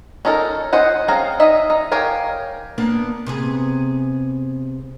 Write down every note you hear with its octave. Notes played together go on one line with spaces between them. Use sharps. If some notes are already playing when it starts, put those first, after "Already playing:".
C#4 D#4 A4 A#4
C#4 C5 D#5 F#5
C4 C#4 G#4 F5 A#5
D#4 D#5 E5
D#4
G4 A#4 C#5 F5 G#5
A#3 B3 D4
C3 B3 G#4